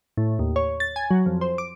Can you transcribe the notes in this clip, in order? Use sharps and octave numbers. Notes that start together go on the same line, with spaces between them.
A2
D#2
C#5
A6
G#5
F#3
F2
C5
D6